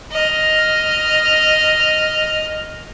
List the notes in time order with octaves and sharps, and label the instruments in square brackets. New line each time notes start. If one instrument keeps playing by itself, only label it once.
[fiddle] D#5 F6